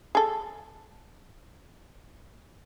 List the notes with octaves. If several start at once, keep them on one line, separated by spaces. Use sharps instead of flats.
G#4 A4